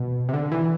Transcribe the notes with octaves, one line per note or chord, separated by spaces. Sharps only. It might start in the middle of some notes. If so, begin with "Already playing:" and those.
Already playing: B2
C3
D3
E3